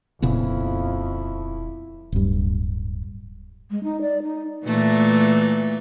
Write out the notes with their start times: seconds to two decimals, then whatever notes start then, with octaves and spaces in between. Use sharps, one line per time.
0.22 D#1 F2 A#2 C#3 B3 E4
2.12 D1 G2
3.71 G#3
3.84 D#4
4.01 D5
4.23 D#4
4.65 A#2 E3 A3